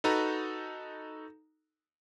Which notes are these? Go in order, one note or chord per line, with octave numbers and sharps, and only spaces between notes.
D#4 F#4 A4 B4 A#5